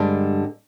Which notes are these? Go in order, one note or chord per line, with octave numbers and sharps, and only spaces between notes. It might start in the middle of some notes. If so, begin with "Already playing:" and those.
Already playing: G2 D3 G#3 D4